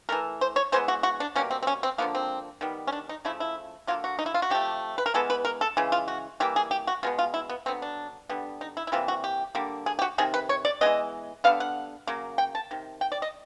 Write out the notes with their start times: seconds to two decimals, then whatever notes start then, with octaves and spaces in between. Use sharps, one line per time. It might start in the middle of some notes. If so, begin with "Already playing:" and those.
0.09 E3 A3 A#4
0.41 C5
0.56 C#5
0.72 E3 G#3 B3 C5
0.88 F#4
1.03 F#4
1.20 D4
1.35 B2 G3 A#3 C#4
1.51 C4
1.63 C4
1.67 C#4
1.83 C4
1.98 D3 F3 A#3 B3
2.15 C4
2.61 D#3 G3 B3
2.87 C#4
2.92 D4
3.09 D#4
3.25 C#3 F3 A3 E4
3.40 E4
3.87 D3 F#3 A#3 F4
4.04 F#4
4.19 D#4
4.26 E4
4.34 F4
4.42 F#4
4.50 C3 F3 A3 G4
4.98 B4
5.06 A#4
5.14 E3 G#3 B3 A4
5.30 B4
5.45 A#4
5.61 A4
5.77 C#3 E3 G#3
5.92 F4
6.08 F#4
6.40 E3 G3 A#3 G4
6.56 G#4
6.71 G4
6.87 F#4
7.03 B2 G#3 B3 F4
7.19 F4
7.34 E4
7.49 B3
7.66 D3 F#3 B3 C4
7.82 D4
8.29 D3 G3 B3
8.61 D#4
8.77 E4
8.87 E4
8.92 C3 E3 G3 A#3 F4
9.08 F#4
9.24 G4
9.55 D3 G3 A#3
9.86 G#4
9.99 G4
10.02 F#4
10.18 C3 D#3 G#4
10.34 B4
10.49 C#5
10.65 D5
10.81 E3 G#3 B3 D#5
11.44 D3 G3 B3 F5
11.60 F#5
12.07 C#3 F#3 A#3
12.38 G5
12.55 A5
12.71 C3 D#3
13.01 G5
13.12 D5
13.22 D#5